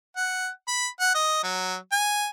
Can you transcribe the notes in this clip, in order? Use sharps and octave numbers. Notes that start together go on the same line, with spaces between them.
F#5
B5
F#5
D#5
F#3
G#5